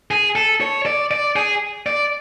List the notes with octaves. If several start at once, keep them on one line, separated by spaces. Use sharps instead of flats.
G#4
A4
C#5
D5
D5
G#4
D5